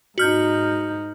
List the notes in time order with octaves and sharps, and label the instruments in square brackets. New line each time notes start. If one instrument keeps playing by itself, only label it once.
[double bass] G#2 D#4 [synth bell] F#4 F6 G6